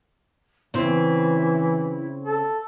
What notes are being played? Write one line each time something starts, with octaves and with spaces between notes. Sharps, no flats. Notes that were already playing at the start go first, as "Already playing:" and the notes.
C#3 E3 C4 E4
A4